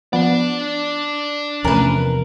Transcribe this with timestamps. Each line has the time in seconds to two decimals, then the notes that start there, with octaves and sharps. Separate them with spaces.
0.13 F3 B3 D4 D5
1.64 E2 C3 F3 A3 C#4 A#4 B4